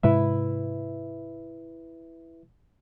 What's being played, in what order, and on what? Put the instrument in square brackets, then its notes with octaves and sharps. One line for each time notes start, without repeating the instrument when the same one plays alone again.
[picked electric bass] G#2 C3 G#3 [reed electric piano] E4 B4 E5